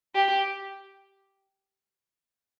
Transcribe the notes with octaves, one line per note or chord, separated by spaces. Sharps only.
G4